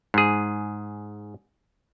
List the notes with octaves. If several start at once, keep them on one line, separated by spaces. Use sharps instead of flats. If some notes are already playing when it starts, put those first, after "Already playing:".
G#2 G#4